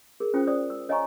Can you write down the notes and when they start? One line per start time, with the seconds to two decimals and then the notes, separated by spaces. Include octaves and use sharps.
0.20 G#4 A#4
0.34 C#4 F4 C5 G5 D#6
0.47 C5 D5 D#6
0.70 E6
0.89 C#5 D#5 F5 G#5 A#5 C#6